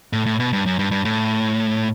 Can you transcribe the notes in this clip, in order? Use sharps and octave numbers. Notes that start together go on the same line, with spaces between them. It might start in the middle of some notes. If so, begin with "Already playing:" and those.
A2
A2
B2
G2
F#2
G2
G2
A2